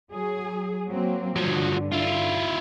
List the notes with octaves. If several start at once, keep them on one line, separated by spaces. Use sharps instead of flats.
F#3 G#4
F#3 A#3 C4
G2 D3 F3 F#3
E4 F4